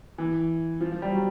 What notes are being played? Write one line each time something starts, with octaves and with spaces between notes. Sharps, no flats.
E3
F3
F3
G3
F#3